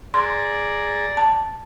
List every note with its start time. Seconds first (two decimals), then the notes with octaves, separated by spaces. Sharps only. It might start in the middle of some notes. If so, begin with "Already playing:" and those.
0.14 G#4 D5 A#5 C6
1.17 A5